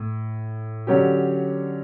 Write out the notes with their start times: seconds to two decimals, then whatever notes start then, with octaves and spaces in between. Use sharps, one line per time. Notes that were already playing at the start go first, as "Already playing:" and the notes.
Already playing: A2
0.87 D3 F#3 C#4 G4